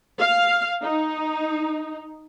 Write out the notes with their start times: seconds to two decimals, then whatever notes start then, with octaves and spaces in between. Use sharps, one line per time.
0.20 F5
0.83 D#4